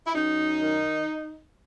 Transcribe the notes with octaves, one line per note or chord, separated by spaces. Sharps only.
E4
F#2 D#4
D#3